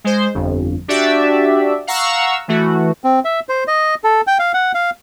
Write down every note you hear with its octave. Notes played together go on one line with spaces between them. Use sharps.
G#3 C5
G1 F2
D4 F#4 G4 D5 E5
F5 F#5 A#5 C#6 E6
E3 A3 F#4
C4
E5
C5
D#5
A4
G5
F5
F#5
F5